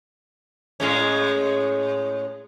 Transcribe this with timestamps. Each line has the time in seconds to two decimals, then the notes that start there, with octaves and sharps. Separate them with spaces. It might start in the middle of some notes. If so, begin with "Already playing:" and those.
0.80 A2 G#3 C#4